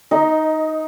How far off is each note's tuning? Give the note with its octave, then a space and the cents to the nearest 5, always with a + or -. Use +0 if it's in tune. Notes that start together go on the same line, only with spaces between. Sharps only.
D#4 +0 D#5 +20